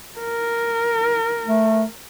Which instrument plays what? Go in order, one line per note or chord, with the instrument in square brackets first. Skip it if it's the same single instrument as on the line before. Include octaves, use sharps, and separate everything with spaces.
[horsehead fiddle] A#4
[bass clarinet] A3